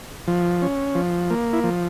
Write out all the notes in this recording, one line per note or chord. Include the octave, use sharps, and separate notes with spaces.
F3
C#4
F3
A#3
E4
F3